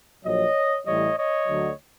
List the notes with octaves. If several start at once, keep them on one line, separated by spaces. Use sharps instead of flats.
A#1 A#2 F#3 C#5 D#5
A1 A2 E3 G3 C#5 D#5
C#5 D#5
D2 D3 F#3